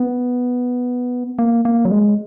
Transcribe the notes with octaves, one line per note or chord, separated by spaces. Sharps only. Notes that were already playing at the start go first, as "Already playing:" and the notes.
Already playing: B3
A#3
A#3
F#3
G#3